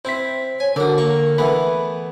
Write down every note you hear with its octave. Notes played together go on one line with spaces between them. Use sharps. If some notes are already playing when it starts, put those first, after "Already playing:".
C4 E4 C5 B6
C#5 G#5
D3 F#4 A#4 D5
A#3 C#6
E3 A3 B3 B5